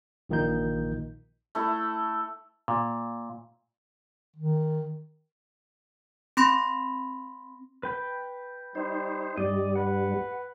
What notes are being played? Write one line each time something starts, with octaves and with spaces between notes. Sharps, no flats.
A#1 A#2 D#3 A#3 D#4 G6
A3 E4
A#2
D#3
C4 B5 C6 A#6
B4 G5 B5
G3 D#4 C5
G2 G3 D5 D#5
B4 F#5